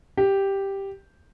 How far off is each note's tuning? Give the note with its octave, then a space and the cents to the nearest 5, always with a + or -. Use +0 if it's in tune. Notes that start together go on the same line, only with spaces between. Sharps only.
G4 +0